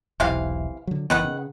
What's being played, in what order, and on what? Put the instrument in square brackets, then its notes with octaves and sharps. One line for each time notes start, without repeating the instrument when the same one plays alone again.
[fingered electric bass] E1 B1 [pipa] C3 E3 F5
[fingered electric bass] D3 F#3
[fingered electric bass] F#1 E3 B3 [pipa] D#3 B4 F#5
[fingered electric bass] C#3